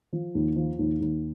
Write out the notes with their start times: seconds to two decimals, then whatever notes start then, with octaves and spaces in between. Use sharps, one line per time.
0.13 F3
0.35 D#2
0.56 F3
0.79 D#2
1.00 D#2